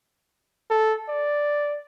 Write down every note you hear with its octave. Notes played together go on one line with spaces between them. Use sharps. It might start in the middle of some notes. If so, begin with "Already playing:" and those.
A4
D5